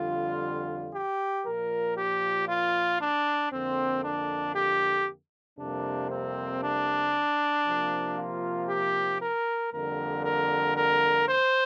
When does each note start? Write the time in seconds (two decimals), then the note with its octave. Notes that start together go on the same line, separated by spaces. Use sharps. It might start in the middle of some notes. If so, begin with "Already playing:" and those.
Already playing: F2 D3 G3 F4
0.94 G4
1.46 A#2 F3 A#3 A#4
1.98 G4
2.49 F4
3.01 D4
3.52 F2 D3 A#3 C4
4.04 D4
4.56 G4
5.59 F2 C3 G3 A#3 D4
6.11 C4
6.63 D4
7.67 C3 F3 A#3
8.18 F4
8.70 G4
9.22 A#4
9.73 F2 D3 G3 A#3 A#4
10.25 A#4
10.77 A#4
11.29 C5